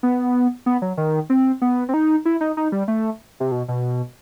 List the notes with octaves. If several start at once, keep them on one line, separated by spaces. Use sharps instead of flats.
B3
B3
F#3
D#3
C4
B3
C4
D#4
E4
D#4
D#4
G3
A3
C3
B2
B2